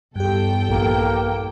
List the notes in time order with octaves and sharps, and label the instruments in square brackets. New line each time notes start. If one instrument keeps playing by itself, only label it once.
[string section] E2 A4 G5 [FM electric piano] G2 G4
[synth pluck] A#1 [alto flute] A#3